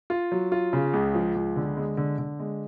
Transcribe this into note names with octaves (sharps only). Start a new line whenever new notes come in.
F4
F#3
F4
C#3
C#2
F3
C#2
D3
G#3
D3
D3
G#3